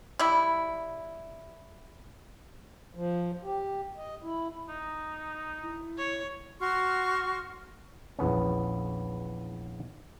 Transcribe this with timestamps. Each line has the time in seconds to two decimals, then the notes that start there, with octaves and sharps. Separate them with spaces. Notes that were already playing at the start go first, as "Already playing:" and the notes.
0.19 G3 E4
2.95 F3
3.43 G4
3.97 D#5
4.22 E4
4.69 D#4
5.61 E4
5.98 C#5
6.60 F#4 C6 C#6 F6
8.19 A#1 E2 B3 C#4